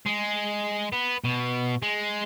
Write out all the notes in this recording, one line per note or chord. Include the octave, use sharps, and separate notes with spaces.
G#3
B3
B2
G#3